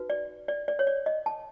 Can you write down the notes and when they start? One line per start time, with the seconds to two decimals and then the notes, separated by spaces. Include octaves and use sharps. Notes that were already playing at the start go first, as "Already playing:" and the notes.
Already playing: D#4 F#4 B4
0.10 D5
0.48 D5
0.68 D5
0.79 C#5
0.87 D5
1.06 D#5
1.26 A5